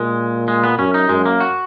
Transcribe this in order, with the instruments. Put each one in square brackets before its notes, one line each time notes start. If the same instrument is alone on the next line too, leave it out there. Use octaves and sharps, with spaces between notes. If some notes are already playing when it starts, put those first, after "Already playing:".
Already playing: [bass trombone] A#2 [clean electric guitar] G#3
[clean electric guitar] G#3
B3
[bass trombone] F#2 [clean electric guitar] C#4
[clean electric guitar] D#4
[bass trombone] F#2 [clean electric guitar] G#3
[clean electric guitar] A#3
F#4